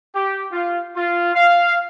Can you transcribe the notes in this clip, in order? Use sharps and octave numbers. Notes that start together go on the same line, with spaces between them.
G4
F4
F4
F5